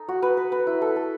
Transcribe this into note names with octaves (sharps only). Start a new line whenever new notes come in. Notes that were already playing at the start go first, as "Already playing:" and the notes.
Already playing: D#4 A4
F#4
B4
B4
B4
E4
A4
A4